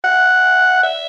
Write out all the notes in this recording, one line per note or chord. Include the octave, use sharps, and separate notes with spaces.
F#5
E5